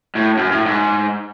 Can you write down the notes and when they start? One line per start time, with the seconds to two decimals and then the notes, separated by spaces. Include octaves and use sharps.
0.16 A2
0.37 F#2
0.52 A2
0.66 G#2